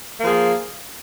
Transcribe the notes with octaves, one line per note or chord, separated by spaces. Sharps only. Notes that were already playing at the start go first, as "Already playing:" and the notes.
F3 A#3 G#4